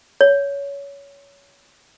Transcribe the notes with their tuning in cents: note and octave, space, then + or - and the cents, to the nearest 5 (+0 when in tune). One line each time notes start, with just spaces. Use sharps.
C#5 +20